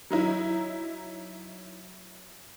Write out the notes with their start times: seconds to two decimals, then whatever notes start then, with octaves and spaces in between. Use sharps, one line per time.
0.10 F#3 D#4 E4